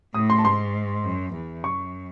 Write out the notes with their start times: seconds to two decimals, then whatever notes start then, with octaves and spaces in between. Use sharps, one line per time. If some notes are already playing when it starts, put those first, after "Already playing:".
0.14 A2 D#6
0.30 C6
0.38 A5
0.44 G#2 C6
1.04 F#2
1.33 E2
1.63 F#2 C#6